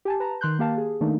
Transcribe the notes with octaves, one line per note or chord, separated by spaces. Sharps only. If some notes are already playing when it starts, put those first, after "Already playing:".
G4 G#5 A5
B4 A5 A#5
D#3 C6 F#6 G6
A#3 G4 F5 A5
G#4
D#3 A3 A#3 D4 D#4